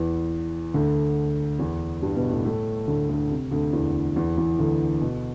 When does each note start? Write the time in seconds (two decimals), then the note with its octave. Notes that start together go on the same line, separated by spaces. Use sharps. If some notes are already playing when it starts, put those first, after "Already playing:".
Already playing: E2 E3
0.74 D2 D3
1.59 E2 E3
2.02 G2 G3
2.16 B2 B3
2.30 A2 A3
2.45 A2 A3
2.87 D2 D3
3.09 D2 D3
3.31 C3
3.51 D2 D3
3.73 E2 E3
4.15 E2 E3
4.37 E2 E3
4.59 D2 D3
5.01 B2